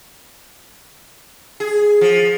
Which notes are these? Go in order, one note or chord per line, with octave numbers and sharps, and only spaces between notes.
G#4
F3